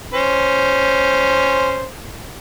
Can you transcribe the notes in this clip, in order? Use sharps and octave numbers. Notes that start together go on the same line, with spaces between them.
C#4 C5